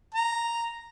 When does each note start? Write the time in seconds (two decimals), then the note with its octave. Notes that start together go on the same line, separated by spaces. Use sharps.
0.15 A#5